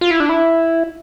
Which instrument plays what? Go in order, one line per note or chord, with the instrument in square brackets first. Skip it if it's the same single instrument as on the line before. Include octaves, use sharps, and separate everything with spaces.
[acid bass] F4
E4
D4
E4